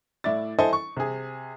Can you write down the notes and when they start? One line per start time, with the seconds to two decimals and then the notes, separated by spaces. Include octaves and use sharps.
0.24 A2 E4 D5 A6
0.59 E4 A4 C5 D#5 G#5
0.73 C#6
0.97 C3 G#4